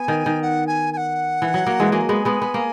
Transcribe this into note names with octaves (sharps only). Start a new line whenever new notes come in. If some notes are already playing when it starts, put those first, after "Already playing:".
Already playing: B3 G#5
D#3
D#3
F#5
G#5
G#5
F#5
E3
F#3
F#3 A#3
E3 G#3
F#3 A#3 G#5
G#3 B3
G#3 B3
B3
A#3